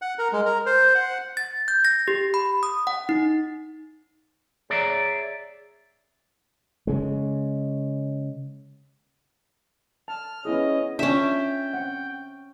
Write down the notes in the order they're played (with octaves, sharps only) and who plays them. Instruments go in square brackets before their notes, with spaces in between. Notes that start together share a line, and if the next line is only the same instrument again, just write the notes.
[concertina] F#5
A#4
G#3
A#4
C5
F#5
[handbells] A6
G6
A#6
G4
B5
D#6
F#5
D#4
[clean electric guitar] G#4 C#5 D5 E5 A#5
[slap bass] C#3 G#3
[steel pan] A5 [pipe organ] F6
[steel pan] B3 E4 G#4 [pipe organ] C#4 D#5
[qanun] C#4 E5 [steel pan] D4 F4 [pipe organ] G5
[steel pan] C4 F#5